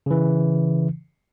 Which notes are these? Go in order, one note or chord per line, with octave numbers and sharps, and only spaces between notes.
C#3 E3